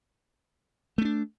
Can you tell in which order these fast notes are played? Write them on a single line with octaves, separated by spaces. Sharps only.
A3 C#4 D4